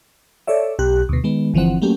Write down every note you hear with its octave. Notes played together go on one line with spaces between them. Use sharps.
A4 C#5 D5 E5
B1 G4 F#6
D2 B2
D#3 G#3 B3
G1 D3 E3 F3 C4 F#5
F#3 A3 A#3 C#4 G4